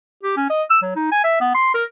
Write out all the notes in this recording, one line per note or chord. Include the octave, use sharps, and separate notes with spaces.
G4
C#4
D#5
E6
F#3
D#4
G#5
E5
B3
C6
A#4